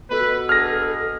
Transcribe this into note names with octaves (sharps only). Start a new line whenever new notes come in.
B2 A4 B4
B3 D4 G#4 F6 A#6